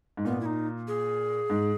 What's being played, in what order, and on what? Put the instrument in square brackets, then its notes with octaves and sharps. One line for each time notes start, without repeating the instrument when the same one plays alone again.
[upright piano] G#2
[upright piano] A#2 [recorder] B3
[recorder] E4
D#4
G#4
[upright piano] G#2